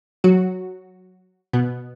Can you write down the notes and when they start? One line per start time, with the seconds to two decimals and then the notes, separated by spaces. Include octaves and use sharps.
0.24 F#3 F#4
1.53 B2 B3